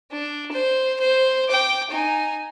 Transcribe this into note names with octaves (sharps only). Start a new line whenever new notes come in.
D4
C5
C5
G5 D6
D#4 G#5